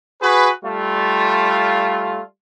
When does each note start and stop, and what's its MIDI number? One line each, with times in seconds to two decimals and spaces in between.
0.21 0.48 66
0.21 0.48 68
0.21 0.48 71
0.64 2.20 55
0.64 2.20 57
0.64 2.20 65